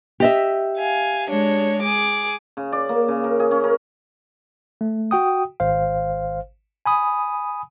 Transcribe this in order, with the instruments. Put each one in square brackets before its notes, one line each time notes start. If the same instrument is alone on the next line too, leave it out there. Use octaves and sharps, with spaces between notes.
[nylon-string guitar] G4 D#5 E5
[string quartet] F5 G#5
G#3 D4 C#5
G#4 D6
[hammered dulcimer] C#3
D5
A#3
C#3
A#4
G#4
C#4
A#4
[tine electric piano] A3
F#4 G5 D#6
G#1 C5 F5
G#5 B5 D#6